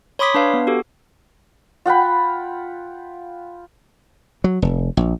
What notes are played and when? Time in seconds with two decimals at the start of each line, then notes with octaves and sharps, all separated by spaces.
0.19 C#5 B5 C6 D6 D#6 B6
0.34 D4 B4 F5
0.54 B3
0.67 F#4 G4 A4
1.86 F4 F#5 G5 B5
4.44 F#3
4.62 F1
4.97 A#1